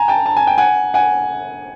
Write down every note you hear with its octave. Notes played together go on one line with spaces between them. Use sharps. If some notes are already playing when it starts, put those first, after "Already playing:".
Already playing: G#5 A#5
G5 A5
A5
G#5
G5
F#5 G#5
F#5 G#5